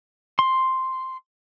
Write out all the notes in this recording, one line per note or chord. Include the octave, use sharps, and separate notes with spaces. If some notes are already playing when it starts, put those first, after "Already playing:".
C6